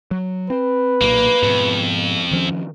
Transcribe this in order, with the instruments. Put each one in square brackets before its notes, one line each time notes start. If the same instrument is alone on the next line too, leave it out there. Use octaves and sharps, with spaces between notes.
[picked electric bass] F#3
[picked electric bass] C4 [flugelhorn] B4
[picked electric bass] B1 A#2 [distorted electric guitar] A#3
[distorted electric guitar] F2 [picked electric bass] G#2 B2
[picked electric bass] D#3 F3 C#4